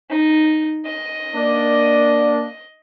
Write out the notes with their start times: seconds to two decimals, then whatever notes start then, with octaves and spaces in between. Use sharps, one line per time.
0.10 D#4
0.86 D#5
1.35 A#3 D4